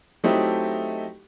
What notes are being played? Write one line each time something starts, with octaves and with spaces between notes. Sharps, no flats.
F#3 A3 C4 D#4 E4 G4